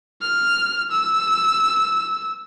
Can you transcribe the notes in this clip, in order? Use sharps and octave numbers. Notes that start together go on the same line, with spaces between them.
F6
E6